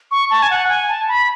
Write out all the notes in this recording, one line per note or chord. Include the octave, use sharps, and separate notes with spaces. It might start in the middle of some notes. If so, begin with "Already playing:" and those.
C#6
A5
G#5
F#5
G#5
A5
B5